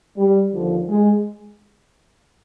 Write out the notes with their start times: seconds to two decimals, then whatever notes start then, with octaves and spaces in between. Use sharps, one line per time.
0.17 G3
0.53 D#2 D3 F3
0.89 G#3